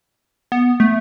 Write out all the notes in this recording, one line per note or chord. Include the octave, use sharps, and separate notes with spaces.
B3
A3